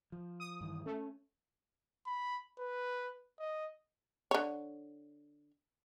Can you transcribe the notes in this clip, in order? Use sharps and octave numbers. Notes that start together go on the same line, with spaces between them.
F3
D#6
G2 D#3 E3
A3 C#4
B5
B4
D#5
D3 C#5